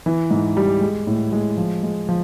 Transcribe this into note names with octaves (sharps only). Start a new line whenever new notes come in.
E3
G#2
G3
G#3
A2
G#3
F3
G#3
F3